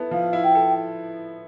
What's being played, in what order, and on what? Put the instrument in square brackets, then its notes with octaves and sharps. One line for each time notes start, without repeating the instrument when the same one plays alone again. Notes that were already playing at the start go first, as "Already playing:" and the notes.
Already playing: [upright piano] B3 E4 A4
[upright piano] F3 [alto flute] F5
[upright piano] E4
[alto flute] G5
[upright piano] A4